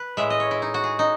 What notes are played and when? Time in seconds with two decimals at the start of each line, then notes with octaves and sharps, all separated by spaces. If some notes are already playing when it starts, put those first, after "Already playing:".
Already playing: B4
0.17 A2 G#3 E5
0.30 D#5
0.40 C#5
0.51 E4
0.62 D#4
0.74 F#4
0.84 G#4
0.99 D#4